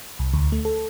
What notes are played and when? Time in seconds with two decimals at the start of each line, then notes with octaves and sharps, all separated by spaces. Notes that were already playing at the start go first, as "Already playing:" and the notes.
0.19 C2
0.34 D2
0.52 A3
0.65 A4